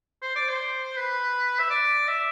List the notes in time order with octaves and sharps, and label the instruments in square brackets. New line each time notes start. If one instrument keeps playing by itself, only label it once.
[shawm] C5
D5
C5
B4
E5
D5
E5